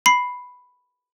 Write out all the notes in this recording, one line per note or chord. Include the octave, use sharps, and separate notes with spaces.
B5 C7